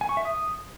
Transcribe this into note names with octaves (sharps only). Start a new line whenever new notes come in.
G#5
C#6
E5
D#6